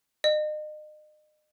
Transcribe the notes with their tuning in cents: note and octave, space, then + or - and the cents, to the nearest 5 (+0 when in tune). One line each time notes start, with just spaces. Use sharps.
D#5 -35